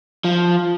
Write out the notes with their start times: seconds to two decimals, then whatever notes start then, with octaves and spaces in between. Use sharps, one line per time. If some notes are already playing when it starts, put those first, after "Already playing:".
0.24 F3